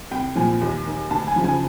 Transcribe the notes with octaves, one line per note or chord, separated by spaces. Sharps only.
C2 G5
A#2 F3 G#5
D#2
D#3
D2 A5
G#5
C#3 F3
G#5